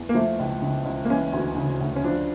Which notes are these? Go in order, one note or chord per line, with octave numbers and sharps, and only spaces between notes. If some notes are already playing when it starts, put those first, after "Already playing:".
Already playing: E2
A#3
F3 A3
C#2
C#3
C#2
A#3
E3 C#4
D2
C#3
D2
C#4
F3 D4